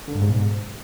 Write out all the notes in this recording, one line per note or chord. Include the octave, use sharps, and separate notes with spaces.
D3
G2
G#2
B2
G#2